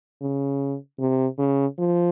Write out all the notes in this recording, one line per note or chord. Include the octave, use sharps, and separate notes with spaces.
C#3
C3
C#3
F3